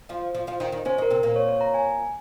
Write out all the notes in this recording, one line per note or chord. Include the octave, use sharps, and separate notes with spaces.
F3 F4
F3 F4
F3 F4
D#3 D#4
D#3 D#4
C#3 C#4 C5
D#3 D#4 A#4
C3 C4
A#2 A#3
C#5
C#5
A#5
G#5